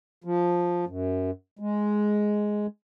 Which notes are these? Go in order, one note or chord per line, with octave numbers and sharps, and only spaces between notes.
F3
F#2
G#3